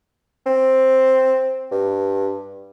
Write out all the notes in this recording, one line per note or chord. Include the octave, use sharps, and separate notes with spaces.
C4
G2